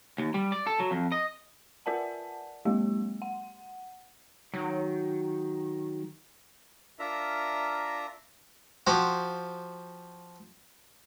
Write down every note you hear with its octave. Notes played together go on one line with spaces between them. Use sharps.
D#2
G3
D5
A4
F#3
F2
D#5
F4 A#4 D5 F#5 A5
F#3 G#3 A#3 G4
F#5
D#3 F#3
D4 F4 A#4 E5 A#5
F3 F#4 G4 C5